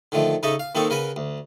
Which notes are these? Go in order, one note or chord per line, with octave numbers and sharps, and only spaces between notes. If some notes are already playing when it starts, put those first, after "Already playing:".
D3 D#3 F3 A3
C#3 D#4 A4 D#5 E5 C#6
F5
D#3 A#3 C4 D#4 A4 C#6
C#3 A#4 B4 F#5 G#5
D2